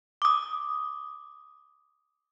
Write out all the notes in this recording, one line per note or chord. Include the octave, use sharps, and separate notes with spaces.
D6 D#6